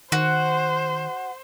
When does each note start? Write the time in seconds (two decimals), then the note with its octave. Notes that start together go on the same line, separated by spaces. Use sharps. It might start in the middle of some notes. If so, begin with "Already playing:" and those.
0.12 D#3 F#4 C5